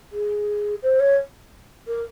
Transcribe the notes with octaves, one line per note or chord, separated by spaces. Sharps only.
G#4
C5
C#5
A#4